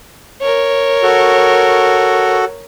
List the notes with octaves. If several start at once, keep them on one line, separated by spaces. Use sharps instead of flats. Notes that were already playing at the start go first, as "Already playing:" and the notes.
A#4 C#5
F#4 A4